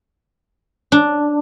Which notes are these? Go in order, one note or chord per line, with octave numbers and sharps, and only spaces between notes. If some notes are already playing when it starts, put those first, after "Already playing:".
D4